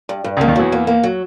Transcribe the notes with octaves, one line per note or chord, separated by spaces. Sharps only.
G2
G2
C#2 C#3
A#3
D#2 D#3
E2 E3 F#3
A#3
A#3
F#3